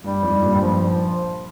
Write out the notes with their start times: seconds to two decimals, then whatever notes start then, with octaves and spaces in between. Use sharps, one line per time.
0.04 G2 G3
0.23 F2 G#2
0.33 G#2
0.42 G2 A#2
0.55 G3
0.62 F3